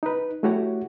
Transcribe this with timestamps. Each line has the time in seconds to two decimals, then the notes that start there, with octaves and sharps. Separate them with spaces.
0.03 D#4 B4
0.43 A3 E4 F#4 G4 C#5 F#5